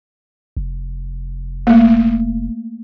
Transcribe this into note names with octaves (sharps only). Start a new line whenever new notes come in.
F1
A3 A#3